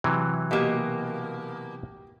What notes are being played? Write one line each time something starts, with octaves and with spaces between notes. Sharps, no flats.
C3 E3 F#3
B2 A#3 G4 D#5